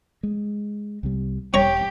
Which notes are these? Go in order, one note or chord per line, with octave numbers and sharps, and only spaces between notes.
G#3
C2 C3 G3
E1 G4 C#5 A#5 C#6